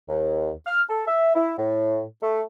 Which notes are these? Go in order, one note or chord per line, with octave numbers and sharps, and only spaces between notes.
D#2
F6
A4
E5
E4
A2
A3